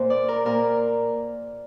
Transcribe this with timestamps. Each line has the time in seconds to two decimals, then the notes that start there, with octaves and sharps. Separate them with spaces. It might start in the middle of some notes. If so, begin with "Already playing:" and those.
Already playing: A#2 A#4 C5
0.10 D5
0.28 A#4
0.46 A#2 A#4